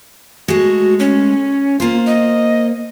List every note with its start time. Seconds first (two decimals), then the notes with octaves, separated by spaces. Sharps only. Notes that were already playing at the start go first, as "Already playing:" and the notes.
0.48 G#3 A3 F#4
0.99 C#4
1.80 A#3 F4 C5
2.06 D#5